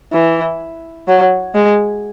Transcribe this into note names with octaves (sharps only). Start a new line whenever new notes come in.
E3
F#3
G#3